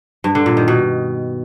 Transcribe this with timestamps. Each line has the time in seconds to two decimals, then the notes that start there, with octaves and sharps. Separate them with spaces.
0.24 G2
0.35 D3
0.46 A#2
0.57 D#3
0.68 B2